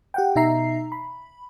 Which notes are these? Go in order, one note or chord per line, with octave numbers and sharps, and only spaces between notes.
G4 F#5 G5
B2 D#4 E5 A#5 C7
B5